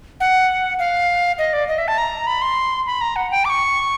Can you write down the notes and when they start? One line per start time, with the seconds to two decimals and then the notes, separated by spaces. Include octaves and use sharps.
0.20 F#5
0.79 F5
1.39 D#5
1.53 D5
1.68 D#5
1.78 E5
1.88 A5
1.98 A#5
2.27 B5
2.42 C6
2.86 B5
3.01 A#5
3.16 F#5
3.31 G5
3.45 D6
3.50 C#6